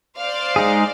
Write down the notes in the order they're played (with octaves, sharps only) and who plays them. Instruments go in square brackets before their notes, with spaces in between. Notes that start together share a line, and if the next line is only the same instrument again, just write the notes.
[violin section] C5 D5 F5
[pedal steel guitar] G#3 D#4 G#4